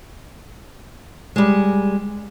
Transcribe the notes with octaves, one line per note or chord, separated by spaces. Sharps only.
G3 G#3